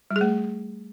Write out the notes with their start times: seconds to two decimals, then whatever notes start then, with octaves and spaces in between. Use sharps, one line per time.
0.11 G3
0.16 G#4
0.21 A3